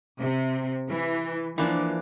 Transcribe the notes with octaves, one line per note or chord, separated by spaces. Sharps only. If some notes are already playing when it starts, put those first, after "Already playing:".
C3
E3
E3 F3 A#3 D4